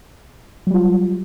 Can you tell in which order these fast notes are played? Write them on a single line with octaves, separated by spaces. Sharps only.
F#3 G3 F4